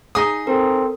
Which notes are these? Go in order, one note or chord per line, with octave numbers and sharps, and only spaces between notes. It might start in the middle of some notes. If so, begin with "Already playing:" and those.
D#4 G#4 D#6
C4 A4 A#4